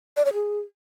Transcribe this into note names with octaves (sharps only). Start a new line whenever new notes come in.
D5
C#5
G#4